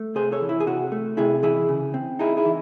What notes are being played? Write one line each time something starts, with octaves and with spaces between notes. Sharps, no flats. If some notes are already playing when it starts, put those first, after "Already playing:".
Already playing: A3
C3 G#4 C5
A4 C#5
E3
E4
G#4
C3 F#4
A3
C3 E4 G#4
E3 E4 G#4
C#3
C4
D#4 E4 G#4
E4 G#4
E3